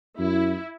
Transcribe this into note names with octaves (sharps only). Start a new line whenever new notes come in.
F#2 E4